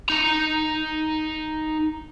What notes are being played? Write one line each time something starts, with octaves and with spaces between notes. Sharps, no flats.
D#4 A#5